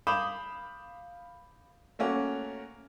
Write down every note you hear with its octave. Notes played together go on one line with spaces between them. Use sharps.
F5 B5 D6 D#6 G6 E7
A3 A#3 C#4 F#4